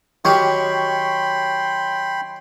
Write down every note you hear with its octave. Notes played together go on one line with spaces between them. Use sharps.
D#3 F#3 G4 C#5 G5 B5 C6